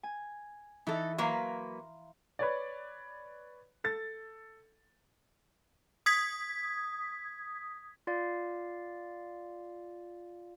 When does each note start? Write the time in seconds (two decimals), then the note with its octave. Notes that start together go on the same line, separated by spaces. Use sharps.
0.03 G#5
0.87 E3 D#4 A4 E5
1.18 F#3 A#3 B4 F5 A#5 C6
2.39 B4 C#5 D5
3.84 A4 A6
6.06 D#6 G#6 B6
8.07 F4 D5 F5